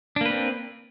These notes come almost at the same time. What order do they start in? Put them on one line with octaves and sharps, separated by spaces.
D4 A#3 B4 C4